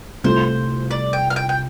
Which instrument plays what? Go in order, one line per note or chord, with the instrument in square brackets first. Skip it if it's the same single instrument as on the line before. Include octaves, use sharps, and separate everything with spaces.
[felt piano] C2 C3 A3 F4 A4 [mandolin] C5
[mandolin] D5
G5
F5
G5
G5